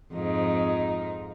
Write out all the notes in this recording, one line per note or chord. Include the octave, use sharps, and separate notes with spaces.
F2 G#2 D#4